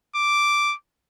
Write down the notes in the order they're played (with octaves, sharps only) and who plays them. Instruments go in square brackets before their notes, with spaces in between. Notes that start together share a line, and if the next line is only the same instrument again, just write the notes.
[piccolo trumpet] D6